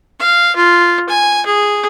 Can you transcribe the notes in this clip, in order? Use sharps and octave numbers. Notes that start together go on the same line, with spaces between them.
F5
F4
G#5
G#4